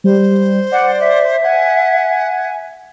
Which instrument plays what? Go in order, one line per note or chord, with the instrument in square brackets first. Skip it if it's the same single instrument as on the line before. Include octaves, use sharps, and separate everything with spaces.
[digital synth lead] G3 [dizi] C5
[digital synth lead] D5 [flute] F#5
[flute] E5
[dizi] F#5 [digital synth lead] G#5